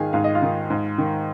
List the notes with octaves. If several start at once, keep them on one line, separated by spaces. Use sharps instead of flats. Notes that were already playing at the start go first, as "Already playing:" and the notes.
Already playing: G#2 D#3 G#4 F5 G#5
G#2 F5
D#5
F4 F5
D#3
G#2
D#3